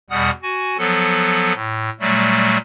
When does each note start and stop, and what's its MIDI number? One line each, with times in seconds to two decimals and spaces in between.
0.10 0.30 40
0.10 0.30 47
0.10 0.30 55
0.10 0.30 78
0.10 0.30 87
0.10 0.30 89
0.43 0.77 66
0.43 0.77 80
0.78 1.53 53
0.78 1.53 54
0.78 1.53 59
0.78 1.53 69
1.54 1.90 45
2.00 2.57 46
2.00 2.57 54
2.00 2.57 55
2.00 2.57 57